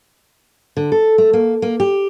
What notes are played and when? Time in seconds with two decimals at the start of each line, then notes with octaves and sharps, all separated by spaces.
0.77 D3
0.92 A4
1.18 A3
1.33 A#3
1.62 A#3
1.80 G4